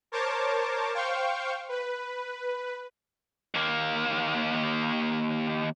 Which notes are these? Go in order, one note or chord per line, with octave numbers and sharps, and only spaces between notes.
A#4 C5 C#5 A5 D6
C5 F5 G5 C#6
B4
D#2 A#3